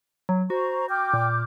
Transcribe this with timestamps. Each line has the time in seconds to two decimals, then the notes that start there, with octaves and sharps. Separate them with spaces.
0.29 F#3
0.50 F#4 C5 A#5 C#6
0.89 G5 D6 F6 G6
1.13 A#2